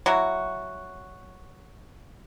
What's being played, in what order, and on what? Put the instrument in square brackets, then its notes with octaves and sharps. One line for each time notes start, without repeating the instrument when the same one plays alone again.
[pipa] F#3 E4 F#4